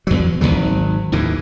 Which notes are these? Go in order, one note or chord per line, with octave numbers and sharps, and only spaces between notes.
E2 F#3
G#1 E2 D#3 F#3
D#2 A2 E3